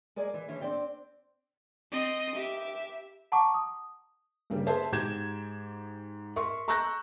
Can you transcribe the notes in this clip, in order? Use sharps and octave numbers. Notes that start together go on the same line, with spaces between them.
G#3 A#4 D5 G#5
E3
D3 E3 C#4
C4 D4 D5 G5
C4 D#5
G4 E5
F#5 A5 A#5 C#6 D6
D#6
G2 C#3 G3 A#3
G#4 B4 C5 E5 A5
G#2 G4 G6 G#6 E7
A#4 E5 C6 C#6
A#5 C#6 E6 F#6 G6 A#6